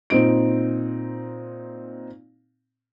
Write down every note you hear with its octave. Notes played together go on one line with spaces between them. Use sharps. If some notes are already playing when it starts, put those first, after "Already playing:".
A#2 C4 D#4 D7